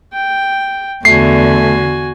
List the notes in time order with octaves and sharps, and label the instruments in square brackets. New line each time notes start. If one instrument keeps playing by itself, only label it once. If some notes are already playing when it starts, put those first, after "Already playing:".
[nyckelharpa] G5
[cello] E2 D3 [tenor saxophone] A3 [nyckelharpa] F#4 G#5 [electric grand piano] C7